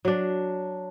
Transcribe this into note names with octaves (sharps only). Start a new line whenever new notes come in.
F#3 D4